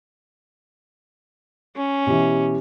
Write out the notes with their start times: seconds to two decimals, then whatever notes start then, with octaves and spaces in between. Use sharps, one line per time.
1.76 C#4
2.06 B2 E3 G4